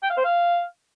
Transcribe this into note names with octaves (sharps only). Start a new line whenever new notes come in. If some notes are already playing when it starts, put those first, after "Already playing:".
G5
F5
C5
F5